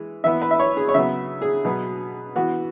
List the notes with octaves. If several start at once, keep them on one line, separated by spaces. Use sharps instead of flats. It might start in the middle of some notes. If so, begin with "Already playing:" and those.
Already playing: E3 G#3
E3 B3 E5
B4
E5
C#5
G#4
C#5
C#3 F#3 B3 E5
G#4
B2 F#3 B3
E3 B3 F#4